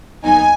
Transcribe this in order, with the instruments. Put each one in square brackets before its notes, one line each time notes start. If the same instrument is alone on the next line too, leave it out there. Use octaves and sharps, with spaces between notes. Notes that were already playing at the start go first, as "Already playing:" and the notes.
[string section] D#2 D#3 F#3 B3 D#4 G#5